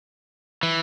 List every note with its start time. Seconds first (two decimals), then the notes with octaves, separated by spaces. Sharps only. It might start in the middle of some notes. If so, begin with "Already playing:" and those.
0.63 E3